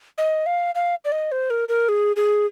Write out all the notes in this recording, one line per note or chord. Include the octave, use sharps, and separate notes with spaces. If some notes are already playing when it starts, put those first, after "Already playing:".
D#5
F5
F5
D5
D#5
C5
A#4
A#4
G#4
G#4